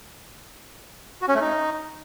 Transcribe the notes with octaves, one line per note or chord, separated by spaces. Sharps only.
F#4
C#4
A3
D#4